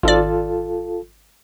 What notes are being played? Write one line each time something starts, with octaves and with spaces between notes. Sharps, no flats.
G#1 F4 A4 D5